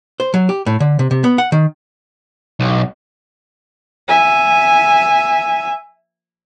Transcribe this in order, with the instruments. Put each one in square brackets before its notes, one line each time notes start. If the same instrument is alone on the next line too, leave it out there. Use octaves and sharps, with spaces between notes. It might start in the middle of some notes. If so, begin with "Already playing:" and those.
[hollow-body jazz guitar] C5
F#3
G4
A2
D3
C3
C3
B3
F#5
D#3
[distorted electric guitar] B1
[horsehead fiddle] E5 G#5